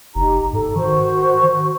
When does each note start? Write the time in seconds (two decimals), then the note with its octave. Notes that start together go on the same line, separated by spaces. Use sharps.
0.15 F#1 D#4 G4 A#5
0.53 G#2 A4
0.76 D#3 F#4 C5 C#6